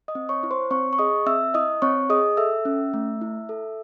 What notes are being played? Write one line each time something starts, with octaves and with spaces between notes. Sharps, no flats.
D#5 D#6
C4
C#5 C#6
E4
C5 C6
C4 C#5 C#6
C#6
G#4 D#5 D#6
C4 E5 E6
E4 D#5 D#6
C4 C#5 C#6
G#4 D#5 D#6
A4 E5 E6
C#4
A3
E4
A4